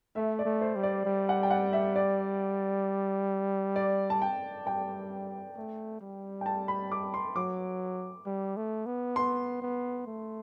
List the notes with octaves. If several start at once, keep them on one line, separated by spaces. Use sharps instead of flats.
A3 E5
D5
A3
C5
G3
D5
G3
F#5
G5
F#5
E5
D5
D5
A5
G5
G3 G5
A3
G3
G5
A5
B5
D6
C6
F#3 D6
G3
A3
B3
B3 C6
B3
A3